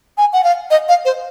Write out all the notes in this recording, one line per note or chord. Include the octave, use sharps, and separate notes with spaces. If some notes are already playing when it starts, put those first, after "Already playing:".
G#5
F#5
F5
D#5
F5
C5